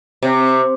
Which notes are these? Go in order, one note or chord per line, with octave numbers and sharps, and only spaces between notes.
C3